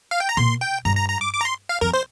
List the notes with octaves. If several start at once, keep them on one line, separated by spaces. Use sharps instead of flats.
F5
G5
A#5
A#2 C6
G5
G2 A#5
A#5
A#5
D6
D6
A#5
C6
F5
F2 A#4
C5